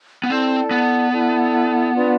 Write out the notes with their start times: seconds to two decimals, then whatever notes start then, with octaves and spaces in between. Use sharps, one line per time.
0.24 B3
0.29 C4 E4 A4 D5 A5
0.71 B3
1.12 E4 A4 D5 A5
1.94 D4 F4 B4 D5